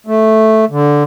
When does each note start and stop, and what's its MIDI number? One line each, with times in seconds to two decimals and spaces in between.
0.06 0.65 57
0.70 1.03 50